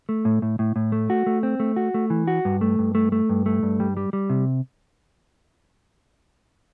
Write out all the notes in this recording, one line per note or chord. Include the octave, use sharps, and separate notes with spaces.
A3
A2
A2
A2
A2
A3
F#4
A3
C4
A3
F#4
A3
E3
F#4
G2
A3
G2
A3
A3
G2
A3
G2
G3
G3
G3
C3